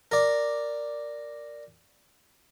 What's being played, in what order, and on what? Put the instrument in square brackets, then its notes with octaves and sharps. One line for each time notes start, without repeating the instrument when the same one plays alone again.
[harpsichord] A#4 D5